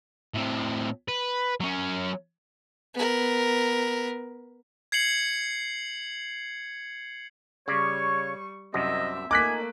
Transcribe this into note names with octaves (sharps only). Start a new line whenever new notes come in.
A2 C4
B4
F#3 C#4
B3 A#4
G#6 C7 C#7 F#7
C#3 G3 C#5 D5 C#6
C2 F#2 C3 C4 D#5 E5
A3 A#3 D#4 G#5 D6 F#6 B6